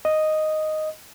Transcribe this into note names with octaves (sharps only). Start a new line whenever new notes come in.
D#5